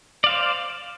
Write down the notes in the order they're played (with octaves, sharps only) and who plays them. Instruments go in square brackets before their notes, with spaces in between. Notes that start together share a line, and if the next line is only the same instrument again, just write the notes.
[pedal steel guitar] D5
F5
C5